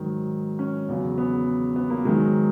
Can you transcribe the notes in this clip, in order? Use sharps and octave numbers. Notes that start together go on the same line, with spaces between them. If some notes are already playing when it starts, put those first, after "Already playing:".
Already playing: G#2 D#3 F#3
C#4
E2 C#3 F#3
B3
B3
A#3
G#2 D#3 F#3 G#3